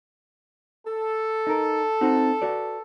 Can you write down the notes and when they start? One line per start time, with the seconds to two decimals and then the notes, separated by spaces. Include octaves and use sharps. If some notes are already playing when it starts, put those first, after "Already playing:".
0.86 A4
1.47 D#4 A#4
2.01 C4 D#4 F#4
2.42 F#4 B4 D5